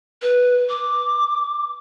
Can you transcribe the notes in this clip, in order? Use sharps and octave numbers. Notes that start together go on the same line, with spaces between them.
B4
D6